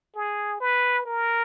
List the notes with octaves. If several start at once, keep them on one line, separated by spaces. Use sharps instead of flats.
G#4
B4
A#4